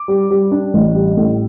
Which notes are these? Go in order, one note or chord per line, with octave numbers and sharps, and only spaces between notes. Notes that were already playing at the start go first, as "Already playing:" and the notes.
Already playing: D6
G3
G3
D4
A1
G3
A2